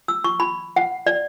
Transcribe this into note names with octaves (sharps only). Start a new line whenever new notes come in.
E6
C#6
B5
F#5
D5